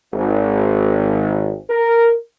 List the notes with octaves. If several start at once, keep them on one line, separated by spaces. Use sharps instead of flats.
G#1
A#4